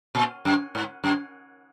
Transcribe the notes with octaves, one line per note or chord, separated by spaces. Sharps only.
A#2
F#2
G#2
F#2